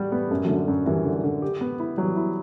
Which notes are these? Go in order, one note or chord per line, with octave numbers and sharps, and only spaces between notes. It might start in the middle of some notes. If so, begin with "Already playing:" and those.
Already playing: G3 F#4
A3 B3
A3
F#2
D3 F#3 A3
F#2
F#2 E3 G3
D3
D3
G4
B3
E4
E3 F#3 G3
E4